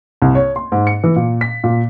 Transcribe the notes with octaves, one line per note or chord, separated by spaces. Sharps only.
C2
C#5
C6
G#2
C#7
E3
A#2
B6
A#2